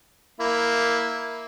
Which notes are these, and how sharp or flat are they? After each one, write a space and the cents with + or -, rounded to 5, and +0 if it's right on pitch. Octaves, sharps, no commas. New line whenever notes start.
A#3 +0 E4 -10